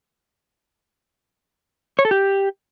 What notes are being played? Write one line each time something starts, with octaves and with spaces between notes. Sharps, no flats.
C#5
A4
G4